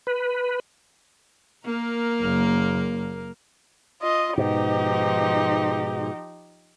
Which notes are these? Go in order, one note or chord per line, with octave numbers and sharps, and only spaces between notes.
B4
A#3 A#4
F#1
F4 D#5
G#2 B2 F3 D#4 G4